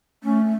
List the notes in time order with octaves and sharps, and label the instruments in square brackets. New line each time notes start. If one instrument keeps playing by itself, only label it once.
[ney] A3 [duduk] C#4